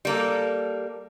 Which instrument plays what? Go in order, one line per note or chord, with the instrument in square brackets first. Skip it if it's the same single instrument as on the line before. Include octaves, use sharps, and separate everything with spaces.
[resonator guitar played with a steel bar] G3 A#3 A4